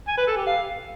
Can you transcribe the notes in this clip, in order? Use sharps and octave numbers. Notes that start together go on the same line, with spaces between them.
G#5
B4
A4
G4
F5